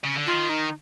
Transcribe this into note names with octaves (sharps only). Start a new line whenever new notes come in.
C#3
D3
D#3 F4
D#4